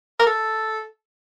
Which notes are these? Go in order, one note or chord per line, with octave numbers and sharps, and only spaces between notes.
A#4
A4